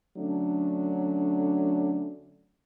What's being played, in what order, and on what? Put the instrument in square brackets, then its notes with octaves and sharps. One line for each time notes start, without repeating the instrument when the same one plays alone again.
[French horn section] D3 F#3 A3 C#4 D4